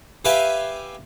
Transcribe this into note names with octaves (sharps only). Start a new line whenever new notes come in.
G4 B4 E5 F5 G5 G#5